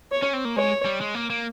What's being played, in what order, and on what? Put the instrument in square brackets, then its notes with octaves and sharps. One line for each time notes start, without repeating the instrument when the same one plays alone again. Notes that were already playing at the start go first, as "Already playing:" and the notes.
[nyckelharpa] C#5
[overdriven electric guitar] C#4
C4
A#3
[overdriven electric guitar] G#3 [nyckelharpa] C#5
[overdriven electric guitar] G3
G#3
A#3
A#3